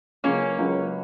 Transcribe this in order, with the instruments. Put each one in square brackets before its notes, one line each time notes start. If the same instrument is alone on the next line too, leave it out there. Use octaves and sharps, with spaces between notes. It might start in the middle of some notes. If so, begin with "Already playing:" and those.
[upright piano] C#2 C#3 F#3 [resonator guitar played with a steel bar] A#3 C#4
[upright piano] C#2 C#3 F#3